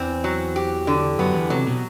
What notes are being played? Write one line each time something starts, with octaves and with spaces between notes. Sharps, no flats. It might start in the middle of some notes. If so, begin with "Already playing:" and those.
Already playing: E2 E3 C4
F#3
G4
D3
F#2 F#3 B3
E2 E3
C3 F#3
B2